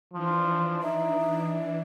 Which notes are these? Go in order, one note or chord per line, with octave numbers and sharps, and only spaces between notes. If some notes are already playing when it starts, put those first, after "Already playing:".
E3 F3 D4
D#4 E5